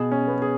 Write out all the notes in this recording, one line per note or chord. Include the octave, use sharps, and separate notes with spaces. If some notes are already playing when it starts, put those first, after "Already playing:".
Already playing: B2 G#4
C#4
B3
G#4